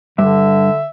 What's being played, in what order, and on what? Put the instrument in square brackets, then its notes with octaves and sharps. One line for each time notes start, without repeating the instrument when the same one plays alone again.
[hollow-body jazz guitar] G2 [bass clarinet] D3 [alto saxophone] E5